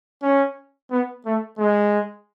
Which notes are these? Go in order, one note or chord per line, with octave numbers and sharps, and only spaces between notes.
C#4
B3
A3
G#3